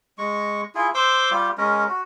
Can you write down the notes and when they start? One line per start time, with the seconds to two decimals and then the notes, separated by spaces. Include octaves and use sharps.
0.18 G#3 C#6
0.75 E4 F4 G#4
0.94 C5 C6 D6 E6
1.31 G3 F4 G4
1.58 G#3 C#4 A#4
1.88 F#4